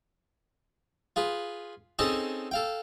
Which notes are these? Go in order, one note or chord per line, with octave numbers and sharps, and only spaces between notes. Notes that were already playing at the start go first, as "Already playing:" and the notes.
F4 G#4 B4
C4 C#4 D#4 G#4 A4 A5
A4 F5 G5